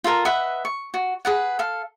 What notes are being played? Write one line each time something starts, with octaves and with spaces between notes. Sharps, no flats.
F4 A4 A#4 A#5
B4 D#5 E5 F#5
C#6
F#4
G#4 B4 F#5
A4 F5